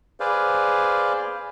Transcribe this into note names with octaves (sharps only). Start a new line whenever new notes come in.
G#4 B4 C5 D5 F5